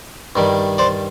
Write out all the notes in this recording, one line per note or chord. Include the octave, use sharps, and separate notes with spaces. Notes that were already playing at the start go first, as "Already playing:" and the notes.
G2 D#3 G3
C5 D5